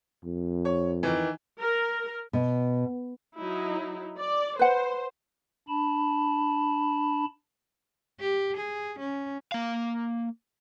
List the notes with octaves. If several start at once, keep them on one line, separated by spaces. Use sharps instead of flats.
F2
C#5
D#3 E3
A#4
B2
F#3 D#4 E4
D5
B4 C5 F#5
D4 A5 B5
G4
G#4
C#4
A#3 F5